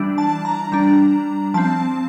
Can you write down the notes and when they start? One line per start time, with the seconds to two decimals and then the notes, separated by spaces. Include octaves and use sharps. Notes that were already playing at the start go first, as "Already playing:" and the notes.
Already playing: E3 G3 D4
0.18 A5
0.45 A#5
0.72 G3 D4 A#5
1.54 F3 C4 A5